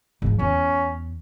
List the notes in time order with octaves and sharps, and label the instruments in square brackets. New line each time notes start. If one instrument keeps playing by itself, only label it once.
[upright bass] G#2 F3
[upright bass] E2 [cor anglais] C#4